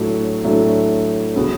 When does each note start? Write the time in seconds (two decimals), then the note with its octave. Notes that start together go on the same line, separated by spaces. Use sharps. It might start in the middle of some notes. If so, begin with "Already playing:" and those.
Already playing: A2 F#3 A3 D4
0.44 A2 F#3 A3 D4
1.36 C#3 F#3 B3